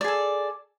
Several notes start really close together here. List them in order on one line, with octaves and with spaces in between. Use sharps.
D5 G#4 A4